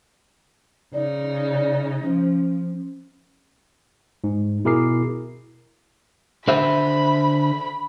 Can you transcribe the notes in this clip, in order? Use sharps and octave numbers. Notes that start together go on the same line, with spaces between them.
C#3 D#4 D5
F3 C#4
G#2
B2 E4 G#4 A#4 D6 C7
D3 C5 E5 B5